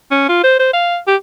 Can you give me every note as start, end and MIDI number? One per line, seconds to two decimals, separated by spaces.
0.11 0.27 61
0.29 0.40 65
0.44 0.54 72
0.59 0.71 72
0.73 0.98 77
1.07 1.16 67